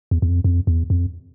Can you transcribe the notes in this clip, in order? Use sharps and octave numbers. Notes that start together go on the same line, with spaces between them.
E2
E2
F2
F2
E2
F2